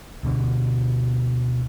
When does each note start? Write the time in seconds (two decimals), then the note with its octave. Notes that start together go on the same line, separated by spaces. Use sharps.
0.23 D2 B2 D3